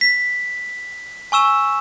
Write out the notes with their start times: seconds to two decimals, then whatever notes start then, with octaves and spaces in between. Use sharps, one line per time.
0.01 B6
1.32 G#5 C#6 E6 E7